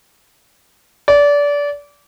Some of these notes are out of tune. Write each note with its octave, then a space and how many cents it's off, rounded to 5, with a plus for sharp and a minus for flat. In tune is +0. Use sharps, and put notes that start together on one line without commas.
D5 -25